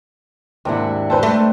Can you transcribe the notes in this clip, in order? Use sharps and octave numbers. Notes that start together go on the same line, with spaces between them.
D#2 G#2 C3 D4 E4 F#5
C4 B4 C5 A5
A3